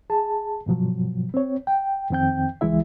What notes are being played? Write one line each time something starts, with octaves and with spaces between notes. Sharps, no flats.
G#4 A5
G2 B2 F3 F#3
C4 C#5
G5
F2 D#3 C4 G5 G6
C#2 E3 G#3 E4 E5